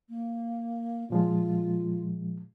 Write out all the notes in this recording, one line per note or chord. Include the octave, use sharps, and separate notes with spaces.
A#3
A#2 F3 G#3 F4